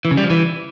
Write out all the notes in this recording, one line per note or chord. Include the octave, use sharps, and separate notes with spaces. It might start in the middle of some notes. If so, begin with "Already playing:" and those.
E3
C#3
G3
F3
E3